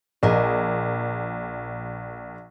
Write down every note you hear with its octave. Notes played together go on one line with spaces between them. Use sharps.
A#1 G#4 A#4 D#5